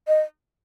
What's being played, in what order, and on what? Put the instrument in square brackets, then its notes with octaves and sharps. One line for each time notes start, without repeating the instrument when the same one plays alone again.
[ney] D#5